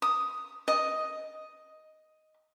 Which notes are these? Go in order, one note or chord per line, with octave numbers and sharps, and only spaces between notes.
D#6
D#5